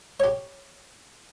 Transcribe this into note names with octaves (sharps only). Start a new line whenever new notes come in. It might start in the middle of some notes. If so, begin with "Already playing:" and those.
G4 C#5